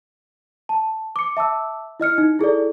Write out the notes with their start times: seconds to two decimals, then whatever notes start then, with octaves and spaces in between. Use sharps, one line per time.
0.69 A5
1.16 D6 C#7
1.37 E5 A5 D6 E6
2.00 E4 D#5 F6 C#7
2.18 D#4
2.39 E4 G#4 A4 D5